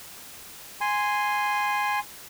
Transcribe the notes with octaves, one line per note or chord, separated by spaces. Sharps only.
G#5 C6